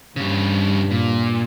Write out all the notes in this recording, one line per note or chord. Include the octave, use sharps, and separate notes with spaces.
G2 C#3 G3
A#2